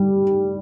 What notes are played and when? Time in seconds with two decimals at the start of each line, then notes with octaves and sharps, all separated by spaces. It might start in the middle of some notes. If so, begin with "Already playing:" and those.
Already playing: G3